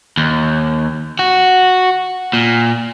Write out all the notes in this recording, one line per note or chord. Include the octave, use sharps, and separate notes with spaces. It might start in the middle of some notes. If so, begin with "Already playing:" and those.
D#2
F#4
A#2